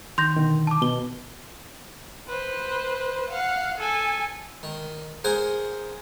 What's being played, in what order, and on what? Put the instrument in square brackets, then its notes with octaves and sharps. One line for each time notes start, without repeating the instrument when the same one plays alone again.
[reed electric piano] D#3 [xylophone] C6 G6 A#6
[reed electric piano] B2 D3 D#3
[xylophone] A5 D6
[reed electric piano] B2 [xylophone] G7
[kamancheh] B4 C5
F5 F#5
A4 G#5
[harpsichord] D#3
G#4 A#4 C5 F#5 G#5